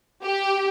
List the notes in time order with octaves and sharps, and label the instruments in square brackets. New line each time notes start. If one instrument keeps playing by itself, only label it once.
[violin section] G4